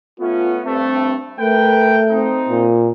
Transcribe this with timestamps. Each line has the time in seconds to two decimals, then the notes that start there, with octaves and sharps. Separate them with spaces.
0.20 A3 B3 C#4 F4
0.66 G2 A3 C4
1.40 A3 A#4 B4 G5
2.11 C4 D#4
2.49 A#2